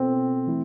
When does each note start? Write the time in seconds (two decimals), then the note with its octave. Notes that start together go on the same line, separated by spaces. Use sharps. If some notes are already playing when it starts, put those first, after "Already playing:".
Already playing: B2 B3 C4 F4 A4
0.47 E3 A3 E4